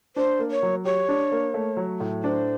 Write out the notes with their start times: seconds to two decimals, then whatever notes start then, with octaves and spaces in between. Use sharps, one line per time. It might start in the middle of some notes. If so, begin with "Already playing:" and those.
0.16 D4 C5
0.39 A#3
0.51 C#5
0.63 F#3
0.85 G4 C#5
1.09 D4
1.32 A#3
1.54 A3
1.77 F#3
2.00 A2
2.23 D4 C5